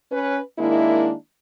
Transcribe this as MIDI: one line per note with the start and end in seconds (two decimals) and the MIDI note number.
0.11 0.39 61
0.11 0.39 71
0.58 1.12 51
0.58 1.12 56
0.58 1.12 58
0.58 1.12 62
0.58 1.12 64